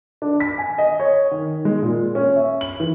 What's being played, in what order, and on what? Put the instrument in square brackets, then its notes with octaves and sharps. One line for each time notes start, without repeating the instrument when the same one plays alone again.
[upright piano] D4
B6
G#5
D#5
C#5
D#3
G#3
A#2
C#4
E5
F#7
E3